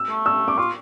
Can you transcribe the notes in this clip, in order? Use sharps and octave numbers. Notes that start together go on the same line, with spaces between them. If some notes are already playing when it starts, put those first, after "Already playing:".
Already playing: E6
A3
E6
D6
F4 C#6